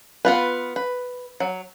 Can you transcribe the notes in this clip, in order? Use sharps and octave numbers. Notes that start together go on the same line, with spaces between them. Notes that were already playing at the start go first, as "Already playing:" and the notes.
B3 F4 B4
B4
F#3